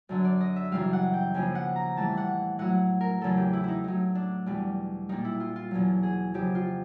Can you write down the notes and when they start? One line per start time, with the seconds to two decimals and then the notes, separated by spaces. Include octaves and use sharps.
0.09 F#2 D3 F#3
0.25 D5
0.41 D#5
0.56 E5
0.71 F#2 C#3 E3 G3 F5
0.93 F#5
1.14 G5
1.34 D#2 C#3 F3 G#5
1.55 F#5
1.76 A#5
1.96 A2 E3 G3 A5
2.17 F#5
2.59 A2 F#3 F#5
3.01 A#4
3.21 E2 C#3 F#3 A4
3.37 G4
3.53 E4
3.64 D#4 E4
3.84 A2 F#3 D#4
4.15 D4
4.46 E2 B2 G3
5.09 A#2 G3 D#4
5.25 E4
5.40 F4
5.56 F4
5.71 E2 B2 F#3
6.03 G#4
6.34 F2 C#3 F#3 G4
6.55 F4